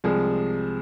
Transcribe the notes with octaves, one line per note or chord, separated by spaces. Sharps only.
C2 C3 F3 G#3 G#4